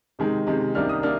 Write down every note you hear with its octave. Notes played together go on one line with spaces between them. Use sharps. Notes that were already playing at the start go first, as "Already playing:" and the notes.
C3 D#3 G#3
C3 D#3 G#3
C2 C3 D#3 A#3 D4 F6
D#6
A#3 D4 F6